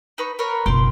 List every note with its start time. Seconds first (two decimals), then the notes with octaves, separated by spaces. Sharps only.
0.18 D#4 B4 C#5
0.39 A#4 B4 C#5
0.66 F#1 B1 F4 G5 C6